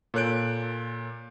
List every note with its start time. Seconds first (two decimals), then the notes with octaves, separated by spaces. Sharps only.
0.14 A#2 A4 C#5 F#6 G6 D7